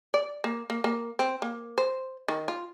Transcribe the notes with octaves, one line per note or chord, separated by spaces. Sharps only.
D5
A#3
A#3
A#3
C4
A#3
C5
D#3
F4